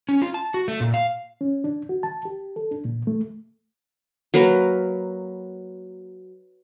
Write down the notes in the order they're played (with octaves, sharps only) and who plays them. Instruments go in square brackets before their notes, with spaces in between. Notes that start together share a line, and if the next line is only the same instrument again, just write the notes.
[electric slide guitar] C#4
F4
A5
F#4
A3
A#2
F5
[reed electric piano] C#4
D4
F#4
A5
G4
A4
D4
A#2
A3
[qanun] F#3 A#3 A#4 B4